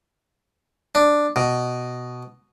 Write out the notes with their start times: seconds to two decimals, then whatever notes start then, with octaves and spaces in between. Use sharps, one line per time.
0.95 D4
1.36 B2